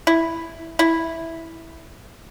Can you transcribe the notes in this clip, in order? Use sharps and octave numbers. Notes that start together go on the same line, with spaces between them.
E4
E4